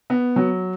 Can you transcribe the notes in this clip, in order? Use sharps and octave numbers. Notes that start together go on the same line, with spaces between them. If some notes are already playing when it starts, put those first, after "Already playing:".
B3
F#3